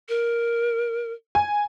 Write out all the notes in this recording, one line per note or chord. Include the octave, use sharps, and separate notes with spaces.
A#4
G#5